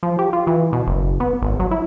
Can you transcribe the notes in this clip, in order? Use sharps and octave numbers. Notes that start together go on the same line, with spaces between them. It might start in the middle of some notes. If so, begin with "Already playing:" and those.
F3
G4
F4
E3
B2
F#1
B3
G#1
F#3
E4